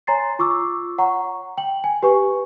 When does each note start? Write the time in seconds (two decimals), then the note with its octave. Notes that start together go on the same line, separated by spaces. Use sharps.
0.07 C#5 G#5 A#5 C6 A6 C7
0.39 F4 C#6 D6 E6
0.98 C#5 F#5 A#5 C#6
1.58 G5 F#7
1.84 G#5
2.03 G4 B4 G#5 C#6